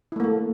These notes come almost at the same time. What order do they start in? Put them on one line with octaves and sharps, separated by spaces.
E4 A3 A#3 A4